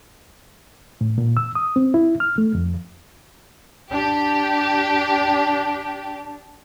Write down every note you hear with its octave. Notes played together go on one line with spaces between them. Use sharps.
A2
A#2
E6
D#6
C4
E4
F6
A3
F2
D4 G4